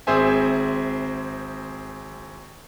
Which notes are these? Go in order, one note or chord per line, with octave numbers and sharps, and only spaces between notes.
G#1 C4 G#4 C5 E5 G#5